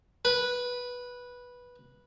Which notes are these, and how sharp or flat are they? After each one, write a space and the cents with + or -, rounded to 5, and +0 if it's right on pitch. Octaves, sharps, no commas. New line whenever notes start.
B4 -10